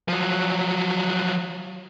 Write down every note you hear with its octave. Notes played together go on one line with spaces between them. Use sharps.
F3 F#3